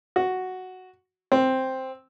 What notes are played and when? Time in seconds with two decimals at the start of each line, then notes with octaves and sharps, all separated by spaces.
0.16 F#4
1.32 C4